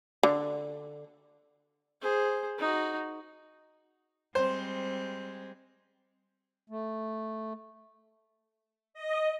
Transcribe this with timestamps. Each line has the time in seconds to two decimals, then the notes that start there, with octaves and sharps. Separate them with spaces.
0.23 D3
2.01 G#4 C5
2.58 D#4 F#4
4.35 G3 G#3 C4 C5
6.70 A3
8.94 D#5